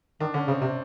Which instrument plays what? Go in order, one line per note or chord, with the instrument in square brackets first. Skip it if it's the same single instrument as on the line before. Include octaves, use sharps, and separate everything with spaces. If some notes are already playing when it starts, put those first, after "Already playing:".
[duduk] D#3 [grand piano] D4
[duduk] D3 [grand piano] C#4
[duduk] C#3 [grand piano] C4
[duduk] C3 [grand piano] C4